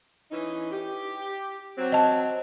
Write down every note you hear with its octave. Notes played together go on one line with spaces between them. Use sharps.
E3 C#4 D#4
G4
F#3 C4
D#5 A5